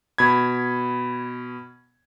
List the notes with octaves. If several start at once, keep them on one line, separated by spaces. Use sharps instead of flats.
B2 B5 G#6